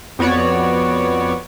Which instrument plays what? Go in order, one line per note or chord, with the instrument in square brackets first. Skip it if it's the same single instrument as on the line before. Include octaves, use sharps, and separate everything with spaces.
[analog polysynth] F2 B3 F#4 C#5 D5